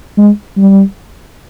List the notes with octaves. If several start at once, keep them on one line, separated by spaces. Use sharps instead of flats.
G#3
G3